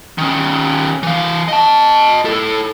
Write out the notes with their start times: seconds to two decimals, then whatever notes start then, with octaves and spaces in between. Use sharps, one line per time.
0.18 D#3 C#4
1.03 E3 F5
1.48 D#5 A5
2.25 E4 A4